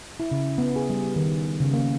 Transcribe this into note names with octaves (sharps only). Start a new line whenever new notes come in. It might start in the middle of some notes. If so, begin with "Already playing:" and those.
E4
C#3
B3
G#4
G3
D#3
C#3
A#3